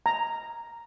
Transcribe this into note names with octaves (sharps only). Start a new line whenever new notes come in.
A#5